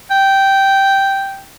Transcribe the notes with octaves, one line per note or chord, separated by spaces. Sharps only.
G5